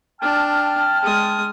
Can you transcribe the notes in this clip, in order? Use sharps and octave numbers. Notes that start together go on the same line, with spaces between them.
D4 G5 A5 F6
G#3 D#6